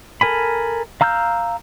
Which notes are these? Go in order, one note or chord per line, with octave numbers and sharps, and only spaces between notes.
A4 A#4 G#5 B5
F5 A#5 E6 F6 G6